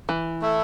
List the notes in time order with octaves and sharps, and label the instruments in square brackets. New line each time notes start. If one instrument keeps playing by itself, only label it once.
[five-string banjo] E3
[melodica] A3 E4 A4